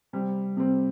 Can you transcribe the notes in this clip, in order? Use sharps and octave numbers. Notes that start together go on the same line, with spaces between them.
C3 G3 C4
C3 G3 C4